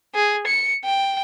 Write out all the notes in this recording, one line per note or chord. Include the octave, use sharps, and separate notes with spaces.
G#4
C#7
G5